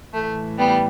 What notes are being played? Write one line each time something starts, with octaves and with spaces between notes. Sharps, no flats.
A2 E3 A3
G3 B3